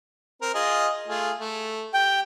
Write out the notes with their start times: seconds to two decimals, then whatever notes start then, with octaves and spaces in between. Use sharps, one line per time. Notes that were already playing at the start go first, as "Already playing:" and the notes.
0.41 C4 A#4
0.54 F4 G#4 D#5
1.07 A3 F4 G#4
1.40 A3
1.94 G4 G5